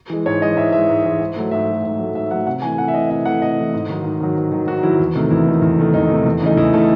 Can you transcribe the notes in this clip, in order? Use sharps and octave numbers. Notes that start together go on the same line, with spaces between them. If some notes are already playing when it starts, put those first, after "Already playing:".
E3 G#3
G#2 C#5
E3 G#3 D#5
G#2 E5
E3 G#3 E5
G#2
E3 G#3
G#2
F#3 A3
G#2 E5
F#3 A3
G#2
F#3 A3
G#2 E5
F#3 A3 F#5
C3 F#5
E3 A3 G#5
C3 F#5
E5
E3 A3 D#5
C3 E5
E3 A3 F#5
C3 D#5
E3 A3
G#2
D#3 F#3
G#2
D#3 F#3
G#2
D#3 F#3
G#2 F#4
D#3 F#3 E4
E2
C3 D#3 A3
E2 E4
C3 D#3 A3
E2
C3 D#3 A3
E2 D#4
C3 D#3 A3
E2
C#3 E3 A3 D#4
E2 E4
C#3 E3 A3 A4